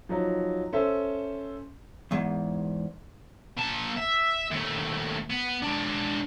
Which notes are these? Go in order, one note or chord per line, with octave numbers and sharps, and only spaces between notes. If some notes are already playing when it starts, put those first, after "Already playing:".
F3 F#3 D#4
C#4 A4 C5 E5
E2 G#2
A#3 A5
E5
D#2 A3
B3
G#3 D4